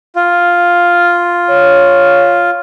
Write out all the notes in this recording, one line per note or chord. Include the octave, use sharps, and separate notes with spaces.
F4
C#5